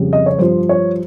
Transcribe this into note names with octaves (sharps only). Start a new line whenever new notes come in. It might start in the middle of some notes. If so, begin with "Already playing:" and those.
Already playing: F2 C#3 G3
D#5
C#5
G2 F3 C5
C#5